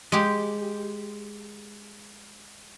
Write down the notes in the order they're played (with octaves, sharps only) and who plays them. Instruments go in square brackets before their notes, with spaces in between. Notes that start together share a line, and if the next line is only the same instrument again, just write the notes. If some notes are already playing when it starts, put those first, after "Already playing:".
[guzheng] G#3 G4